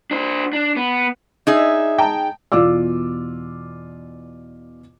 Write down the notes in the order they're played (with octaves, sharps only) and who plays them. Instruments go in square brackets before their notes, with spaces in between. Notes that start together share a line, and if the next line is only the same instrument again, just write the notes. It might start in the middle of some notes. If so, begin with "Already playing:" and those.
[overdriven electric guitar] D4 C5
D4
B3
[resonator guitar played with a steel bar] D#4 G#4 [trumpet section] D5 E5
[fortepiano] G5 A5 A#5
[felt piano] E2 B2 F4 D5 D6 E6